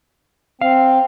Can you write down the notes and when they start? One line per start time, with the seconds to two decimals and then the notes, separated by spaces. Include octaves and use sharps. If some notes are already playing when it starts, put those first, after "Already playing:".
0.61 C4 F5